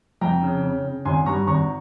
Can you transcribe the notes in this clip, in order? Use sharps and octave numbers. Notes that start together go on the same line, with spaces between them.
F2 G5 A#5
C#3
C#3
C#3
G#1 G#5 C6
G2 A#5 C#6
G#1 A#5 C#6